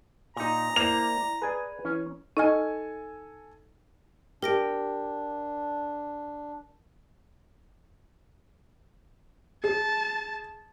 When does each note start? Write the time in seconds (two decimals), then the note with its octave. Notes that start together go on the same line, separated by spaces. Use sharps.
0.37 A#2 D#4 A#5
0.76 A#3 E4 C5 D5 F7
1.42 G#4 B4 D5 G#5
1.85 E3 C#4
2.37 D#4 A4 D#5 G#5 F6
4.42 D4 G4 A#4 A#6 D7
9.64 G#4 A5